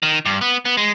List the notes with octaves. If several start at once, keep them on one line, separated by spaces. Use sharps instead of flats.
D#3
G2
B3
B3
G#3